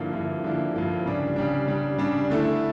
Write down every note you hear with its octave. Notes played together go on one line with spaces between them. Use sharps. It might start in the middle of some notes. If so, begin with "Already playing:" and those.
Already playing: G2 D3 F3 A#3 E4
G2 D3 F3 A#3 E4
G2 D3 F3 A#3 E4
G2 D3 F3 A#3 E4
C#3 G3 D4
C#3 G3 D4
C#3 G3 D4
C#3 G3 D4
D3 A3 E4 A4